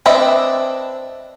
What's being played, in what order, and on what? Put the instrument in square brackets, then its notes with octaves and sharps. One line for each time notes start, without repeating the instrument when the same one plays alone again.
[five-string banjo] C4 D4 B4 D#5 E5